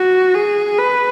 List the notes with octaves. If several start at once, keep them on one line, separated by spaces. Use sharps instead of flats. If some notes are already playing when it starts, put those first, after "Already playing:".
Already playing: F#4
G#4
B4